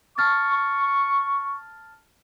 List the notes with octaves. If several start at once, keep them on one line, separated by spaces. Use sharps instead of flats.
A5 C#6 F6 A6